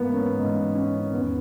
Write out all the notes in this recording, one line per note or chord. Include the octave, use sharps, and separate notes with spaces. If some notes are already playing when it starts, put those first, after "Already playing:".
Already playing: G#2 E3 A#3 B3
C#4
G#2 E3 D#4
C#4
E2 D#3 B3